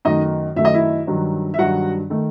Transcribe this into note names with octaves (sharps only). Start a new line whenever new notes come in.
F#2 D#3 A3 D#4 D#5
F#2 D#3 A3 E5
D#5
E4 E5
G2 D#3 F#3
E5
G2 D#3 F#3 F#4 F#5
D#3 A3